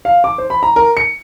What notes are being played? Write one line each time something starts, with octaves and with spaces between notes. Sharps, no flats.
F5
D6
C5
B5
A#5
A#4
C#7